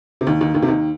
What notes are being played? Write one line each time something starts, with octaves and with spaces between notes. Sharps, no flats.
C3
D#2 D#3
D#2 D#3
D#2 D#3
C3
D#2 D#3